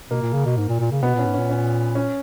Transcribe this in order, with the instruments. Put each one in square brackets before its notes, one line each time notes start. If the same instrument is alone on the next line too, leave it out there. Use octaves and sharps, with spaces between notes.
[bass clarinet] B2 [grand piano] A#3
[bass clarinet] A#2
C#3
B2
G#2
A#2
A#2
C#3
[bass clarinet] B2 [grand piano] B3
[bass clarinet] A#2
[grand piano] C#4
[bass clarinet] G#2
[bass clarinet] A#2 [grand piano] C#4
[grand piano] C#4
C#4